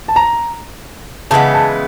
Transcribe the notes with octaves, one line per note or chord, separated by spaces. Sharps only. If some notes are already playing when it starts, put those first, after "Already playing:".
A5
A#5
C#3 E3 G#3 B3 A5
A5